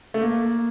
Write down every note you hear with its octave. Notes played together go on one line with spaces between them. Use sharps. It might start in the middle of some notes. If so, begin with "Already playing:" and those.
A3
A#3